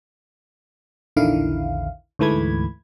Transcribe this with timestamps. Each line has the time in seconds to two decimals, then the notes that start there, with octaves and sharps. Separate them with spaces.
1.16 A#1 E2 D3 D#3 E4 F5
2.19 D2 G#2 E3 A3 B5 G#6